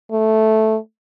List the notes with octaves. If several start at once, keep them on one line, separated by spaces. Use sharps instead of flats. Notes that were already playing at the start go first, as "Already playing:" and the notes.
A3